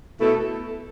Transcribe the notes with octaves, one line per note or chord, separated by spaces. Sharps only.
B2 A3 E4 A4